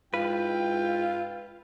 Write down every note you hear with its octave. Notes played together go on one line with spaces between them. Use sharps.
G#2 E4 F4 B4 G5